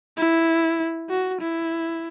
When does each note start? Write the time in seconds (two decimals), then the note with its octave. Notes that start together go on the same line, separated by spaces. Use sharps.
0.17 E4
1.10 F#4
1.41 E4